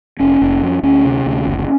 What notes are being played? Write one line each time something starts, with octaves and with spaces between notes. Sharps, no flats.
F1 C#4
F1
F2
D2 C#4
C3
D2
F#1